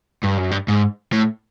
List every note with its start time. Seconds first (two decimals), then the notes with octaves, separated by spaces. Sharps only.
0.24 G2
0.39 F#2
0.51 G2
0.68 G#2
1.12 A2